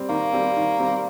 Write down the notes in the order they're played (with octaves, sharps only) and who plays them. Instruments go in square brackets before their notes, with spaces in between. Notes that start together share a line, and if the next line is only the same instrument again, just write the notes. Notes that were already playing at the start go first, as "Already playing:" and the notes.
Already playing: [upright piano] G3 C4
[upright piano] D#3 [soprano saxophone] A#3
[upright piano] G3 C4
D#3
G3 C4